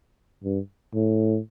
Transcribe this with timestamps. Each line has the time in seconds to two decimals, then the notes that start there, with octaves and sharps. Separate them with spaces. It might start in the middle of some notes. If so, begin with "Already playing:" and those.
0.44 G2
0.94 A2